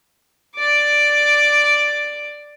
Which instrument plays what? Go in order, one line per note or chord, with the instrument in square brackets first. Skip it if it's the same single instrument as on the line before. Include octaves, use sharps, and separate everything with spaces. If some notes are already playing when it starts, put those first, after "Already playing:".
[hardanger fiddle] D5 D6